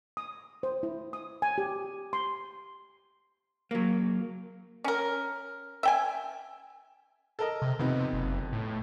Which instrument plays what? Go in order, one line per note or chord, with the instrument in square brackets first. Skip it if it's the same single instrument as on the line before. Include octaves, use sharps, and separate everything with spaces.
[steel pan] D#6
C5
E4
D#6
G#5
G4
C6
[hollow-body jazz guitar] F#3 A#3
[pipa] C#4 A#4
E5 G5 G#5
[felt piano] A4 A#4 D#5
[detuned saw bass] C3
[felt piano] F2 B3 D#4 [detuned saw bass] C3
[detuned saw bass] F#1
A2